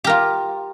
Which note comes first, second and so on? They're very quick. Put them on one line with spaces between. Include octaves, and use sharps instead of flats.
G4 A#4 F4